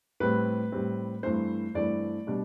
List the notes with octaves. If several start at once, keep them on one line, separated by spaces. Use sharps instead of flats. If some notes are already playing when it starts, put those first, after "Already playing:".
A2 G3 C4 B4
A2 G3 C4
G2 E3 A3 C4 C5
G2 E3 A3 C4 D5
B2 G3 D4